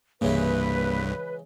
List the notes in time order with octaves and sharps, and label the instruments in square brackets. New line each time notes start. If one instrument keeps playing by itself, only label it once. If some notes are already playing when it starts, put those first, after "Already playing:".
[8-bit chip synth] C2 G2 [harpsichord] C#3 E3 G#3 [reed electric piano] A#3 [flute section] B4